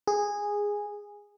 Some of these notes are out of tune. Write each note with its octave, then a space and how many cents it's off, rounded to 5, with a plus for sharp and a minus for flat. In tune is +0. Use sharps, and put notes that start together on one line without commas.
G#4 -10